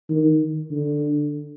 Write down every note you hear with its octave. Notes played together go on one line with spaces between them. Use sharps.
D#3
D3